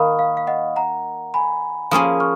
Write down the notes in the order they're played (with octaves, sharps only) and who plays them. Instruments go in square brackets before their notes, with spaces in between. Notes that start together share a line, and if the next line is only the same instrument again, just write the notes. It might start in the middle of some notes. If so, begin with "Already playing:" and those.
Already playing: [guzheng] D#3 A#3 D#4 [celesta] B5 C#6 D#6 F6
[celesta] F5
F5
D#5 F#5
F#5 A#5
G#5 B5
[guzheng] F3 A#3 C#4 G#4 [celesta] B5 D#6
[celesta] C#6 F6